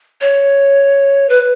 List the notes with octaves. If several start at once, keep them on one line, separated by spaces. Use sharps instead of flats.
C#5
B4